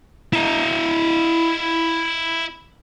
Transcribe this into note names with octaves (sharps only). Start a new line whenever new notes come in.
E4 D#5